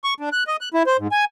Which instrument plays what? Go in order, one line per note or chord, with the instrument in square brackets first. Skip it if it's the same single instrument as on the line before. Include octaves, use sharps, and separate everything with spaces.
[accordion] C#6
D4
F#6
D#5
F#6
E4
C5
G#2
G#5